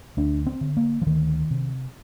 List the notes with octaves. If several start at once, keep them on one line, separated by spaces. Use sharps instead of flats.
D2 D4
C4
D3
A#3
F3
D2 D#3
C3